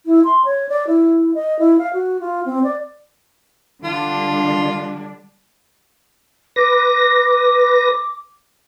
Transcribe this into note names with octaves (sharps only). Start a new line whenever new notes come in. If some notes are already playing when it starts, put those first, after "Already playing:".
E4
C6
C#5
D5
E4
D#5
E4
F5
F#4
F4
C4
D5
D3 G3 D4 F4
B4 D6 A#6